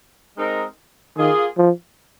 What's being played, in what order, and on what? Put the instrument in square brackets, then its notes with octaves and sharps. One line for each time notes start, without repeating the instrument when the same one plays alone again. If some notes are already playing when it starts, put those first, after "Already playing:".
[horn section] G#3 C4 D#4 A#4
[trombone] D#3 [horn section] A#3 F4 G#4
[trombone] F3